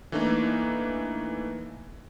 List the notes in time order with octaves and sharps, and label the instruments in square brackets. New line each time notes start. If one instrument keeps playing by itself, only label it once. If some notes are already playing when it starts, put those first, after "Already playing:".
[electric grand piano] E3 A3 A#3 D4 D#4